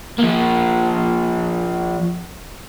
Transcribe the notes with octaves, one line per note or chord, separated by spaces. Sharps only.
F3 A#3